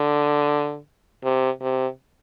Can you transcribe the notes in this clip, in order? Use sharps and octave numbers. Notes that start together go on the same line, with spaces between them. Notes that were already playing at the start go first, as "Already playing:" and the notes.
Already playing: D3
C3
C3